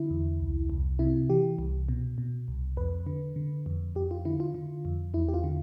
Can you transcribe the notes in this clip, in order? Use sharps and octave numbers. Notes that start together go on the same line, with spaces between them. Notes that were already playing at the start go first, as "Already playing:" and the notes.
Already playing: D3 E4
E2
C2
C2
C3 E4
E3 G4
C2
B2
B2
C2
F2 B4
D3
D3
F2
F2 G4
F4
D3 E4
F4
D3
F2
E2 E4
G4
F4
D3